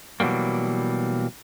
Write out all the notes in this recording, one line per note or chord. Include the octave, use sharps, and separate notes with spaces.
B2 E3 F#3 G3 A#3